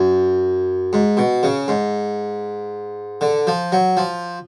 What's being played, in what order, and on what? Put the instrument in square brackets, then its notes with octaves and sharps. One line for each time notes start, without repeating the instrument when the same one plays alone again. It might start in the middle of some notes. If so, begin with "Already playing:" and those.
Already playing: [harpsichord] F#2
G#2
B2
C#3
G#2
D3
F3
F#3
F3